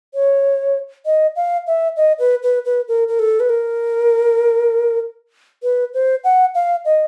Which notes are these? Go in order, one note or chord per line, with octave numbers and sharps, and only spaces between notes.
C#5
D#5
F5
E5
D#5
B4
B4
B4
A#4
A#4
A4
B4
A#4
B4
C5
F#5
F5
D#5